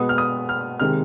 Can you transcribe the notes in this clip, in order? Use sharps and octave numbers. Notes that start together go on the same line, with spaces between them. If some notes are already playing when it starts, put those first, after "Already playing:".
Already playing: B2 G#3 B3 D#6
F6
D#6
F6
C3 D#3 G#3 F6